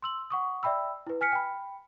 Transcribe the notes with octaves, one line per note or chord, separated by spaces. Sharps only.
C6 E6 F#7
F#5 C#6 D#6
D5 E5 G5 B5 E6
E4 B4
G#5 F6 B6 C#7
G5 B5